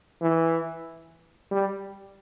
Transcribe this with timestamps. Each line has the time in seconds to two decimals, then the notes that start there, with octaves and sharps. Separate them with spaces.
0.22 E3
1.51 G3